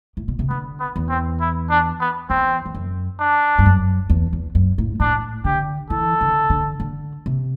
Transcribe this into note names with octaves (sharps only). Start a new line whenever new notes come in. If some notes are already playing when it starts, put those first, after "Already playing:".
A2
B2
C3
D3 B3
B3
E2
C4
E4
D4
B3
E2 C4
E2
F#2
D4
G2
F#2
E2
E2
F#2
A2
A2 D4
D3 G4
E3 A4
D3
D3
D3
C3